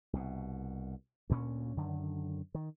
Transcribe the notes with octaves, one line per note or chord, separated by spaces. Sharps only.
C2 B2
D2 A#2 B3 C#4
F#2 D3 D#3
D#3